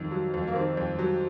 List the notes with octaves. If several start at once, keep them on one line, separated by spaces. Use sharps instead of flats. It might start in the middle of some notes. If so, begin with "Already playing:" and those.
Already playing: F2 D#3
F#3
F2
A#3
D#3 C4
F2
F#3